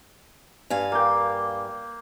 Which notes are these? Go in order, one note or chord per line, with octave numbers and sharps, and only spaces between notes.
G2 F5 G#5
A#3 G5